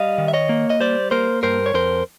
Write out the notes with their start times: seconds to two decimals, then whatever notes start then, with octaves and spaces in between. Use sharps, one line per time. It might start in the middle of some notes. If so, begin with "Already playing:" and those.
Already playing: G3 D#5 F5
0.18 D#3
0.28 E5
0.34 C#5 D#5
0.49 A#3
0.70 D#5
0.80 G3 C5 D5
1.11 A#3 A#4 C5
1.43 G2 A#4 C5
1.66 C#5
1.74 F2 A#4 C5